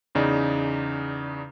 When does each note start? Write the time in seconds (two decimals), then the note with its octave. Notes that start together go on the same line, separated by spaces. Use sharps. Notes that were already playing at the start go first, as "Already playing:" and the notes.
0.15 E2 C#3 D#4 D5